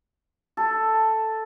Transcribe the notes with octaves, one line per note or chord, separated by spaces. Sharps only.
A4